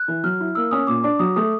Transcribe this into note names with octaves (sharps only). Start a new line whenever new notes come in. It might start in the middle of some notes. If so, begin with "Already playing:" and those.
Already playing: F#6
E3
F#3 F6
E4
A#3 E6
C#4 D#6
A#2 D6
D4 D6
F#3 D#6
A3 D#6